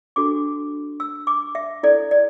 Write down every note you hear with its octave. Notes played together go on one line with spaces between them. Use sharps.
D4 F#4 A4 D6
E6
D6
E5
E4 A4 D5
D5